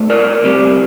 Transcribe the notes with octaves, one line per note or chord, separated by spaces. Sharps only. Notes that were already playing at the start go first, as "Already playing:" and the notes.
Already playing: C2 A3
A#4 D5
D2 C3 G3